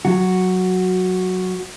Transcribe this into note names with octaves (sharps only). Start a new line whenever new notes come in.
F#3 F#4